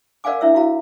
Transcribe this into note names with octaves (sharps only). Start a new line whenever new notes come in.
A#4 D5 F5 F#5 G#5 D6
D4 E4 C#5 E5 E6
E4 F#4 F5 A#5